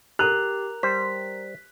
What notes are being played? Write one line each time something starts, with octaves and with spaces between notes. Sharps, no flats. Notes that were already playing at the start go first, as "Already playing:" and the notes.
G4 A#4 A#5 F#6 F7
G3 C5 B6